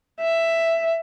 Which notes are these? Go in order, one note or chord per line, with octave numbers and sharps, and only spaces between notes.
E5